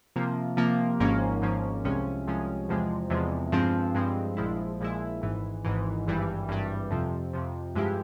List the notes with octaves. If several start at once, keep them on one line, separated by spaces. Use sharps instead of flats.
C3 F3 A#3
C3 F3 A#3
G#1 G#2 F3 A#3 C#4
G#1 G#2 F3 A#3 C#4
C2 C3 F3 G#3 C#4
C2 C3 F3 G#3 C#4
E2 C3 F3 G#3
E2 C3 F3 G#3
G2 F3 G#3 C4
G2 F3 G#3 C4
A#1 A#2 F3 G#3 E4
A#1 A#2 F3 G#3 E4
G#1 G#2 E3
G#1 G#2 E3
G#1 G2 E3 G3
G#1 G2 E3 G3
F2 C3 F3
F2 C3 F3
G2 F3 G#3 E4 G4